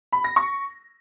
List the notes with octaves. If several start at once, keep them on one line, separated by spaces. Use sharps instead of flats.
B5
A#6
C#6